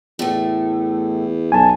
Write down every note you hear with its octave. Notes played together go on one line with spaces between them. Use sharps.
E2 A2 A3
B1 G#5 A5